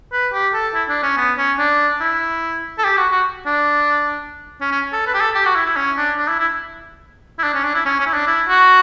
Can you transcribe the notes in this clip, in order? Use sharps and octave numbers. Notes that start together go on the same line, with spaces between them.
B4
G4
A4
E4
D4
C#4
B3
C#4
D4
E4
A4
G4
F#4
F#4
D4
C#4
C#4
A4
B4
G4
A4
G4
F#4
E4
E4
C#4
D4
D4
E4
E4
E4
D4
C#4
D4
E4
C#4
C#4
E4
D4
E4
F#4